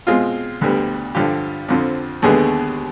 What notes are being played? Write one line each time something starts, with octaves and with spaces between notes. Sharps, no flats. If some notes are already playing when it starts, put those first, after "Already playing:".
B2 G#3 C4 F4
D2 D3 G3 B3
G2 D3 F3 G4
F2 D3 F3 C4
D#2 D3 G#3 B3 G#4